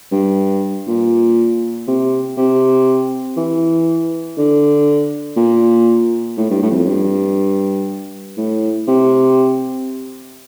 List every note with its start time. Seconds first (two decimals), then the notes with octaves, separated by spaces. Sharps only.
0.11 G2
0.87 A#2
1.87 C3
2.37 C3
3.36 E3
4.37 D3
5.36 A#2
6.37 A2
6.50 G2
6.62 A2
6.70 E2
6.75 F2
6.87 G2
8.37 A2
8.88 C3